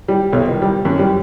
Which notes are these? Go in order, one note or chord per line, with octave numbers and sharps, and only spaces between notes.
G3
B1
D#3
G3
F#2
G3